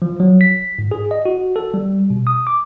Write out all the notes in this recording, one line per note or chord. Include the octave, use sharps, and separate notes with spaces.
F3
F#3
B6
G#2
G#4
D#5
F#4
A4
G3
B2
D#6
D6